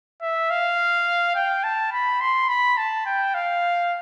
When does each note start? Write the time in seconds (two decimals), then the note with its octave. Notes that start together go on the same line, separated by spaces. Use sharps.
0.22 E5
0.50 F5
1.35 G5
1.64 A5
1.92 B5
2.21 C6
2.49 B5
2.77 A5
3.06 G5
3.34 F5